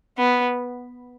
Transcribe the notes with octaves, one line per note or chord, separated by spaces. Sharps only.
B3